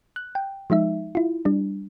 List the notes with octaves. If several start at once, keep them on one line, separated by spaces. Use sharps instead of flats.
F#6
G5
F3 G#3 D#4 E5
E4 F4
G3 D4